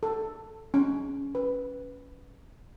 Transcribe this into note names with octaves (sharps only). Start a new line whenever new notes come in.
A4
C#4
B4